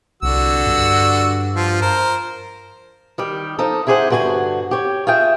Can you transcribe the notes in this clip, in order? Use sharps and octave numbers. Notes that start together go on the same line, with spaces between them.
C2 D3 F#4 E6
G2
F3 F4
A#4 C5
D#3 G3 G4
F3 D#4 A4
E4 G4 G#4 C5 C#5 F#5
G2 D3 F#4 G4 G#5
G4 C#5
F4 G#4 E5 G5